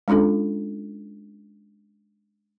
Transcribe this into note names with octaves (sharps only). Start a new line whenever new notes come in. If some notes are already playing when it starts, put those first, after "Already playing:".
G#3 C#4 D4 F4 A4